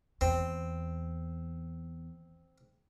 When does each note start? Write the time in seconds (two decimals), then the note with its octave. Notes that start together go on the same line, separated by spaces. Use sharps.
0.21 E2 C4